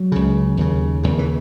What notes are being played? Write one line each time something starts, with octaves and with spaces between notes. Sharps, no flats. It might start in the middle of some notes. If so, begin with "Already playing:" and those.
Already playing: F#3
C#2 C#3
D#2 C#3
D#2 C#3
E3